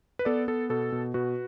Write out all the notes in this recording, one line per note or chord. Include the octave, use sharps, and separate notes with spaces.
B4
B3 A4 D5
B3 A4
B2 A4
B2
B2 F#4 B4